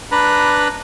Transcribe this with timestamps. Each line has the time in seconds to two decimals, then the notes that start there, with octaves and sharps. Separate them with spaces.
0.12 D4 B4 A#5 B5